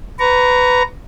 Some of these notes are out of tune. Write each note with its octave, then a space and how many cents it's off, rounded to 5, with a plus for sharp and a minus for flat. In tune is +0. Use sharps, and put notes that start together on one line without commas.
B4 +15 A#5 +0 C#6 +25